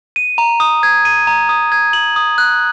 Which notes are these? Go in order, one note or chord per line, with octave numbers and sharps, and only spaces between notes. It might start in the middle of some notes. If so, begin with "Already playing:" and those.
D#7
A#5
D#6
G#6
D#7
A#5
D#6
G#6
F#7
D#6
F#6